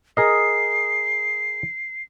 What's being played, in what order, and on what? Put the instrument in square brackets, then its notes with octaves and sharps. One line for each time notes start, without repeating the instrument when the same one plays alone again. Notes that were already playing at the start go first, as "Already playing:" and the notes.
[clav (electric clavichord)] G#4 A#4 D#5 [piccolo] C7